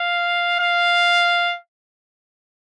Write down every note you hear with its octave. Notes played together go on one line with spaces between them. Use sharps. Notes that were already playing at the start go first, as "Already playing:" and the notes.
Already playing: F5
F5